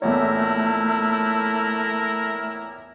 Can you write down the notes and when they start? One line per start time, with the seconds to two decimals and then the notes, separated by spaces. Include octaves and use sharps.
0.02 A#1 E2 A3 E4 A#4 C#5